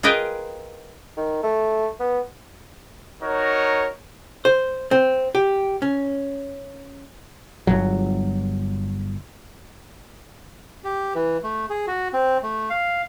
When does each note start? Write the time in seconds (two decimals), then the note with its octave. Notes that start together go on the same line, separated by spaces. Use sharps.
0.03 F4 G#4 A#4 B4 D#5 G5
1.17 D#3
1.43 A3
2.00 B3
3.21 D#4 F#4 A#4 C#5
4.45 C5
4.91 C4
5.35 G4
5.82 C#4
7.67 G1 C2 F#3
10.84 G4
11.15 E3
11.44 A3
11.70 G#4
11.87 F#4
12.13 C4
12.43 A3
12.70 F5